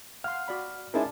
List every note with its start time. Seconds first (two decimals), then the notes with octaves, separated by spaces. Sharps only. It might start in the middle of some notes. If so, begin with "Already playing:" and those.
0.24 F5 F#5 C6 F6
0.48 F#4 D5 B5
0.94 G#3 C#4 D#4 E4 G#4 A#4 D5 A5